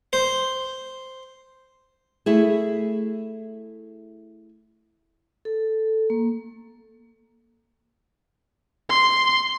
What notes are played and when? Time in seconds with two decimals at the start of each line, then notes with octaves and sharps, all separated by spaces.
0.13 C5
2.26 A3 E4 G#4
5.45 A4
6.10 A#3
8.89 C6